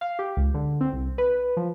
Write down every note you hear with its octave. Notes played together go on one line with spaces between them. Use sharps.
F5
G4
C#2
D3
C4
C2
B4
F3